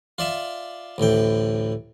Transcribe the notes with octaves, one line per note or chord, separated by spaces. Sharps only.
F4 D5 E5
A1 D2 A2 G5